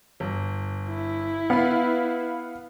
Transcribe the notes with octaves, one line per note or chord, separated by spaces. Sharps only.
G1
E4
B3 B4 F5